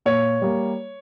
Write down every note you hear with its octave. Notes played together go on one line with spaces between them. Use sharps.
A#2 C#5
G3 A#3